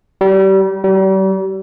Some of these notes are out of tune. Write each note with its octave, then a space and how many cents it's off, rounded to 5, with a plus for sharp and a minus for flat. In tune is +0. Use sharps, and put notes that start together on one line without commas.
G3 -30
G3 -40